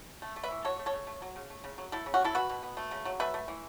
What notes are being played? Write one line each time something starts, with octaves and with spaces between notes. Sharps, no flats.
A3
A3
B4 E5
E3
F#3 A4 C#5
A3
A4 C#5
C#3
A3
F#3
C#3
A3
C#3
F#3
A3 E4 A4
C#3
C#4 F#4
C#3 E4 A4
B2 F#4 B4
B2
B3
A3
C#3
F#3
A3 B4 E5
A3
E3